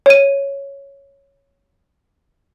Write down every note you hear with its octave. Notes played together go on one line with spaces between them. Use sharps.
C#5 D#7